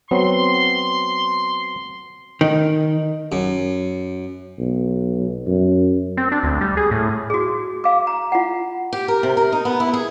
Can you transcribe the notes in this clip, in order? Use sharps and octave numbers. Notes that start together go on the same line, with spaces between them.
F#3 B3 C4 C6
D#3
F#2
B1
F#2
C4
D4
D2
G3
G#4
A2
F#4 G#4
F5 D6
A#5
F4 F#5
G4
A#4
C3
A#4
D#4
B3
E4
G#4